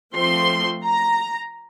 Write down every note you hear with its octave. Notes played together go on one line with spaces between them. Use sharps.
F3 A3 C4 C6
A#5